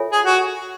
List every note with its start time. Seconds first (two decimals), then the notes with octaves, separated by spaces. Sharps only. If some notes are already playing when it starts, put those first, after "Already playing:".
Already playing: F4 A4 C#5 E5 G#5
0.12 G#4
0.25 F#4